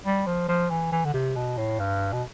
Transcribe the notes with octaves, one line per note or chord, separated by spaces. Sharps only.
G3
F3
F3
E3
E3
D3
C3
B2
A2
G2
B2